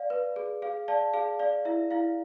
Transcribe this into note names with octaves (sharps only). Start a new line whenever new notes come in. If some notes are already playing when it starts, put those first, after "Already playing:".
Already playing: D5 F5
B4
G#4
G#4 F5
D5 F5 A5
G#4 F5
D5 F5
E4 E5
E4 F5